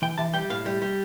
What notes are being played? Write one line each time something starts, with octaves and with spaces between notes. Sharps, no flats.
E3 G5
E3 A5
G3 G5
A2 F5
G3
G3